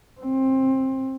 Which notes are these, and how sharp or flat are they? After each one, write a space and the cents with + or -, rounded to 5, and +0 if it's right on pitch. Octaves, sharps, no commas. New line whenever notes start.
C4 +20